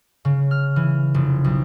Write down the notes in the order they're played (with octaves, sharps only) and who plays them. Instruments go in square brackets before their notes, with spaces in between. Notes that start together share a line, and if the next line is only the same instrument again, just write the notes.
[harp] C#3
F6
E3
F1
B1